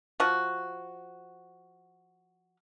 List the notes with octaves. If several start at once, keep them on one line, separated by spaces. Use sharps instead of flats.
F3 F#4